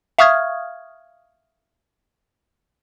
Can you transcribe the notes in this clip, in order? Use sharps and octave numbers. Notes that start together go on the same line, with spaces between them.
E5 F5 C#6 D#6 F6 G#6